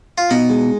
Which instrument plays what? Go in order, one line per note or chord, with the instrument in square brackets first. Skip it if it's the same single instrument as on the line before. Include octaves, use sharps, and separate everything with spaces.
[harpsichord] F4
[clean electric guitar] B2 [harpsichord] D#4
[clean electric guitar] G#3